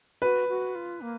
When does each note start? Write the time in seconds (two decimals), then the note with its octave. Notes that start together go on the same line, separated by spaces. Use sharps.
0.22 F#4 B4
0.49 F#4
0.75 F4
1.01 A#3